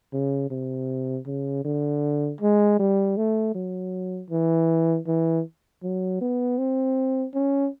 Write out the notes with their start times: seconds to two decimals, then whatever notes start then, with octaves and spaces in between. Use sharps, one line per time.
0.13 C#3
0.50 C3
1.26 C#3
1.65 D3
2.41 G#3
2.79 G3
3.17 A3
3.55 F#3
4.30 E3
5.07 E3
5.83 F#3
6.21 B3
6.58 C4
7.34 C#4